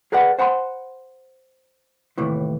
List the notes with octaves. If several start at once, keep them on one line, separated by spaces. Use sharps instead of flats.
G#4 A#4 B4 D5 F#5
C5 F#5 A5 B5 C6
D#2 A2 C3 E3